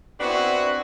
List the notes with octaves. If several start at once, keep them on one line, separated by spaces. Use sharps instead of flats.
B3 C4 D4 E4 F#4